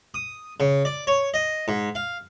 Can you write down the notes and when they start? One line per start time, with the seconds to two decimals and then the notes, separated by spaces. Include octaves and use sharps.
0.14 D#6
0.60 C#3
0.85 D5
1.07 C#5
1.34 D#5
1.68 G#2
1.95 F5